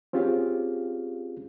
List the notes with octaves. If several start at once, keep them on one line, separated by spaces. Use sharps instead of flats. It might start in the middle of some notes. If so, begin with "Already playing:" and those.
C4 C#4 F4 G4 G#4 F5